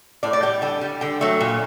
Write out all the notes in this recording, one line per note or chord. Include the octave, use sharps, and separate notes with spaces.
A2 D5
D5
G3 G5
D3 G5
G3
D3 G5
F#3 A3
A#2